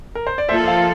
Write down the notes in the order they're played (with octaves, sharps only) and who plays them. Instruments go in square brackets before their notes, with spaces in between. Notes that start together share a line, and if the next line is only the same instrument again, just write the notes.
[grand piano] A#4
C5
D5
[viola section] F3 A#3 F4 A4 [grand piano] C5 E5
[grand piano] F5 A5